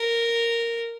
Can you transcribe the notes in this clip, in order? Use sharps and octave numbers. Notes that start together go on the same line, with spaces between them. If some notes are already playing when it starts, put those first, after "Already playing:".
Already playing: A#4